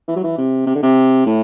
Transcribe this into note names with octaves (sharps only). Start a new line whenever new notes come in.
E3
F#3
E3
C3
C3
D3
C3
A2